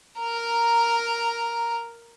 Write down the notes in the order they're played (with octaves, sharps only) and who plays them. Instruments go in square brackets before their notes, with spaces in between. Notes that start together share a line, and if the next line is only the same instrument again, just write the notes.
[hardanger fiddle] A#4 A#5